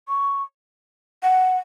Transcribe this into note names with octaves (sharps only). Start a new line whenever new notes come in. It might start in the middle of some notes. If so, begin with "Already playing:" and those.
C#6
F#5